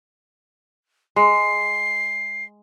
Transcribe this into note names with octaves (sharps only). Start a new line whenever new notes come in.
G#3 C7